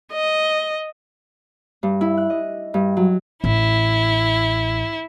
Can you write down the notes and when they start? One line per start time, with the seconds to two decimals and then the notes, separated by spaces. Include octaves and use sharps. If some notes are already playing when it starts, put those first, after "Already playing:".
0.13 D#5
1.83 G2
2.01 E4
2.17 F#6
2.30 D#5
2.74 G2
2.97 F#3
3.44 A1 E4